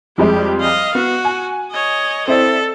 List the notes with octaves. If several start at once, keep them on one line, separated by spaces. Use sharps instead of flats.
F2 G3 G#3 G4
D#5 F5
B3 F#4
G#5
C#5 D#5
C4 E4 A4 D5